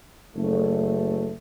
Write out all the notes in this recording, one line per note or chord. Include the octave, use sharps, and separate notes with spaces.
F#1 A3